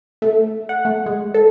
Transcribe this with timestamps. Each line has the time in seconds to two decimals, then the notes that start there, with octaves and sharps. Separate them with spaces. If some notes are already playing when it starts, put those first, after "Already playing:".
0.22 A3
0.69 F#5
0.85 A3
1.06 G#3
1.34 A4